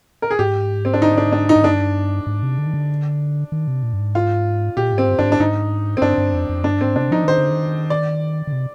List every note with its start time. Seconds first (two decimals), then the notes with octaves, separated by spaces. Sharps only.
0.22 A#4
0.31 G#4
0.39 G#2 G4
0.85 C4
0.94 D4
1.02 D#4
1.18 D4
1.32 D4
1.49 D#4
1.56 G#2
1.64 G2 D4
2.27 G#2
2.43 C3
2.58 D3
2.66 D#3
2.74 D3
3.52 D#3
3.68 C3
3.83 A#2
3.93 G2
3.99 G#2
4.15 F4
4.77 A#2 G4
4.93 G#2 C4
5.08 G2
5.19 G2 D4
5.24 G#2
5.32 D4
5.40 G#2 D#4
5.97 C4
6.02 G2 D4
6.18 G2
6.33 F2
6.49 F2
6.64 G2 D4
6.81 G#2 C4
6.96 C3 D4
7.11 F3 D#4
7.24 D#3 C5
7.38 D3
7.51 D#3
7.90 D5
8.47 D3
8.52 C3